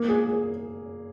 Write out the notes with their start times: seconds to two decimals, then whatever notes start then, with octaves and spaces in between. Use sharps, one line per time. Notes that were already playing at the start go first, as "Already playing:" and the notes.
Already playing: A#3
0.08 G#4
0.27 G#4